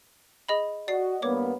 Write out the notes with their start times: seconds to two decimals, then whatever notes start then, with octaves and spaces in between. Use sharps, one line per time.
0.49 G#4 D#5 B5
0.88 F#4 D5 D#5 C7
1.22 G2 A#3 B3 C#5 D6